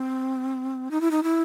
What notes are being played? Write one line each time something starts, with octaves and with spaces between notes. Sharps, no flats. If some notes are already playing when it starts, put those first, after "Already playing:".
Already playing: C4
D#4
E4
D#4
E4